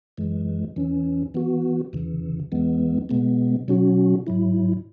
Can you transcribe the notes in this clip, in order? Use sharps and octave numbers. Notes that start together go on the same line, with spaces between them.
F#2 E3 G#3
E2 E3 C#4
E3 B3 F#4
E2 C#3 E3
E2 E3 G#3 B3
B2 G#3 B3
B2 F#3 C#4 F#4
G#2 F#3 E4